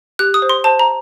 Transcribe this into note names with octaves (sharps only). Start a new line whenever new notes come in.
G4 F#6
D#6
C5
C6
C5 A5
A#5